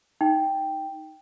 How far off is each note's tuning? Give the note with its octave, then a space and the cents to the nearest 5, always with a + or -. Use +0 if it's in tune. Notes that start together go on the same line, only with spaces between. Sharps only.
D#4 +10 G5 +0